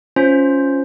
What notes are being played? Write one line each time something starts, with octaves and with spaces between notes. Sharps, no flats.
C#4 F4 C5